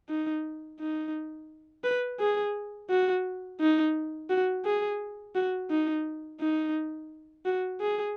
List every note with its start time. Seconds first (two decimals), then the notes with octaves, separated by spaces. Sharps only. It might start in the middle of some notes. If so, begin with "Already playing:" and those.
0.09 D#4
0.80 D#4
1.84 B4
2.20 G#4
2.90 F#4
3.61 D#4
4.30 F#4
4.65 G#4
5.35 F#4
5.70 D#4
6.40 D#4
7.46 F#4
7.81 G#4